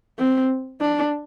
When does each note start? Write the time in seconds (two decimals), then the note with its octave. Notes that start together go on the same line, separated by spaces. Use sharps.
0.19 C4
0.81 D4